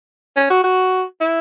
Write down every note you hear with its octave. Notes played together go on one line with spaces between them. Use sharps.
C#4
F#4
F#4
E4